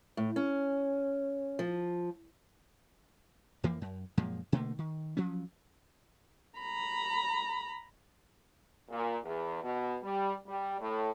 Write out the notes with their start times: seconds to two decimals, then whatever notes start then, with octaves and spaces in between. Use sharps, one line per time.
0.17 A2
0.36 C#4
1.59 F3
3.63 F2 E3 F3 A#3
3.81 F#2
4.17 F#2 A#2 F3 G#3
4.52 B2 D3 A3 A#3
4.78 D#3
5.17 F3 F#3 C#4
6.59 A#5 B5
8.91 A#2
9.24 E2
9.63 B2
10.03 G3
10.47 G3
10.80 A2